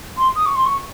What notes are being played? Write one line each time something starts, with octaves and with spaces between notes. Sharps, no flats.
C6
D#6
C#6
C6
C#6